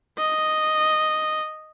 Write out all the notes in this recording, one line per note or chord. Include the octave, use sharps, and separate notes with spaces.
D#5